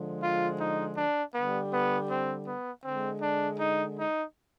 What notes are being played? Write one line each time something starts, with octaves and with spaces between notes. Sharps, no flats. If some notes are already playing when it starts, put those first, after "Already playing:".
Already playing: D3 F3 G#3
F4
D#4
D4
D3 G3 B3
B3
C4
B3
D3 G#3 C4
D4
D#4
D#4